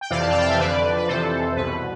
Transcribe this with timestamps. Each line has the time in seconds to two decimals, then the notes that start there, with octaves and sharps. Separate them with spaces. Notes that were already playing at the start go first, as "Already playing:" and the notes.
0.01 G5
0.10 F2 C3 E3 D5 F5
0.21 A5
0.30 G5
0.40 F5
0.50 E5
0.59 F2 D3 B4 D5
0.97 B4
1.08 F2 C3 E3 A4 C5
1.56 C2 B2 B4